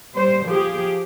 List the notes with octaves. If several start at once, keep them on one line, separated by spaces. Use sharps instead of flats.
G3 C5
F3 G4 G#4